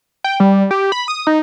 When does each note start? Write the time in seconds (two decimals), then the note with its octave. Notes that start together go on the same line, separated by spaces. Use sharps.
0.24 G5
0.40 G3
0.71 G4
0.92 B5
1.08 D#6
1.27 D#4